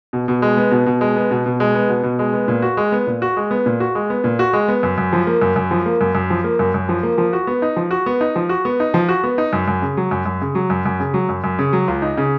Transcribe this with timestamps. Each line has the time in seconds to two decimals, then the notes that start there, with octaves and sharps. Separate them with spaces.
0.13 B2
0.28 B2
0.42 G#3
0.57 B3
0.71 B2
0.86 B2
1.01 G#3
1.16 B3
1.31 B2
1.46 B2
1.60 G#3
1.75 B3
1.89 B2
2.03 B2
2.19 G#3
2.34 B3
2.48 A#2
2.62 F#4
2.77 G#3
2.92 B3
3.07 A#2
3.22 F#4
3.37 G#3
3.51 B3
3.66 A#2
3.80 F#4
3.95 G#3
4.10 B3
4.24 A#2
4.39 F#4
4.53 G#3
4.68 B3
4.83 F#2
4.98 F#2
5.13 F3
5.27 A#3
5.41 F#2
5.56 F#2
5.71 F3
5.86 A#3
6.01 F#2
6.15 F#2
6.30 F3
6.44 A#3
6.59 F#2
6.74 F#2
6.89 F3
7.03 A#3
7.18 F3
7.33 F#4
7.47 B3
7.62 D#4
7.76 F3
7.91 F#4
8.06 B3
8.21 D#4
8.36 F3
8.49 F#4
8.65 B3
8.80 D#4
8.94 F3
9.09 F#4
9.24 B3
9.38 D#4
9.53 F#2
9.68 F#2
9.82 C#3
9.97 F#3
10.11 F#2
10.26 F#2
10.41 C#3
10.55 F#3
10.70 F#2
10.85 F#2
11.00 C#3
11.14 F#3
11.29 F#2
11.44 F#2
11.59 C#3
11.73 F#3
11.88 C#2
12.02 D#4
12.17 C#3